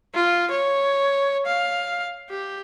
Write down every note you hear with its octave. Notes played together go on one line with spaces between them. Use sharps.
F4
C#5
F5
G4